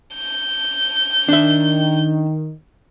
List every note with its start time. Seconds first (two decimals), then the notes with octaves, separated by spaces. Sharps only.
0.15 G6
1.29 D#3 D4 E5